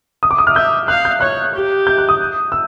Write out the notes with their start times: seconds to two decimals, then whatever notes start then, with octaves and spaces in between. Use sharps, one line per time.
0.23 D#6
0.31 D6
0.39 D#6
0.47 F6
0.55 E5 G6
0.88 F5 F#6
1.05 G6
1.21 C#5 F#6
1.54 G4
1.87 G6
1.98 F#6
2.09 D#6
2.52 E6